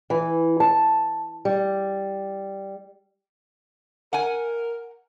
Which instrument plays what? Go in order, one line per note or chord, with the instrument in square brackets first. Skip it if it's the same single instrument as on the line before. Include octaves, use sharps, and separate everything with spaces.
[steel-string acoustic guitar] E3
A5
G3
[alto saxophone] A#4 [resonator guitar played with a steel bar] F#5 G#5